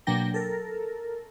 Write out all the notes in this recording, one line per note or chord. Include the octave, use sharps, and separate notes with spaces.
B2 F#3 A#3 D4 G5 A#6
A4 A#4